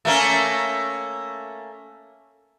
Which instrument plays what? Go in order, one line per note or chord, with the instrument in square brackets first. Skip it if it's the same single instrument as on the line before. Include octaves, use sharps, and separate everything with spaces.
[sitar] A3 A#3 C#4